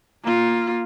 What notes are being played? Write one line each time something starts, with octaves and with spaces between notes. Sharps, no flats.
A#3 F4